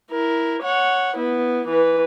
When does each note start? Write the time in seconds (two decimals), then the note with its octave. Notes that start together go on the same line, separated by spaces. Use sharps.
0.11 E4 A#4
0.63 C#5 F#5
1.17 B3 E4
1.68 E3 B4